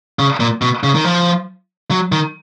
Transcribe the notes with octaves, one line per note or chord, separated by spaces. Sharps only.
C#3
A#2
B2
C#3
D#3
F3
F#3
D#3